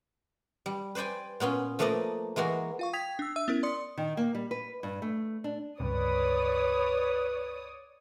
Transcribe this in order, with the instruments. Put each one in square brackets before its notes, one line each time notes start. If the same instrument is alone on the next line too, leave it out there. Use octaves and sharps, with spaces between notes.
[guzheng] G3
B4 C5 D5 G5 G#5
A#2 B3 C#4 F4
F3 A3 A#3 B4 D5 D#5
E3 G#3 A#3 F#4
[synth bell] F4 F5 C#6
G5 D#6 G#6 B6 F7
D4 E6
E5 E6 D#7
B3 C#4 E4 A#4
D5 C6 D#6 C#7
[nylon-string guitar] D#3
A#3
G3
B4
G2
A3
D4
[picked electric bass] C#2 G2 C3 [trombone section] B4 [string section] C#5 D5 D#6